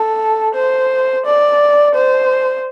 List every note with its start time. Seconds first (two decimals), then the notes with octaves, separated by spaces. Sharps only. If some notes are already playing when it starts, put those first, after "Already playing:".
Already playing: A4
0.55 C5
1.26 D5
1.95 C5